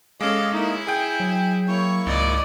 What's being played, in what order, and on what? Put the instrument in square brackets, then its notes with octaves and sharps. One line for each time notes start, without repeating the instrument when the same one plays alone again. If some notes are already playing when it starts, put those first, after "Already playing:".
[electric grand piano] G#3 C#4 [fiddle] A4 [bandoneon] D#5 F5 D6
[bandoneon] A#3 D#4 [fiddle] E4
[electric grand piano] G#4 G5 [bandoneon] G#5
[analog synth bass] F#3
[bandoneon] A#3 E4 C#6 [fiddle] C#5
[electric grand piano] G#1 [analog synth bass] C#2 [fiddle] D5 D#5